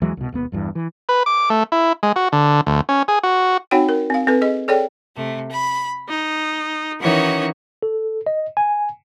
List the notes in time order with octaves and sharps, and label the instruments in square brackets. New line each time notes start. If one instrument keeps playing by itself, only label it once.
[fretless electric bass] D#2 E3 F#3 G#3
C2 B2
E1 D#2 B3
G1 E2 G2 E3
E3
[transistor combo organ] B4
D6
A3
E4
G#3
F#4
D3
D2
C#4
G#4
F#4
[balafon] C4 D#4 F#4 C#5 F#5 G5
A#4
C4 F5
C4 A4 B4
G#4 D#5
G#4 A4 C#5 D5 G5
[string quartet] C3 A3
B5
D#4
D#3 E3 C#4 D#4 F#4 C#5
[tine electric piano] A4
D#5
G#5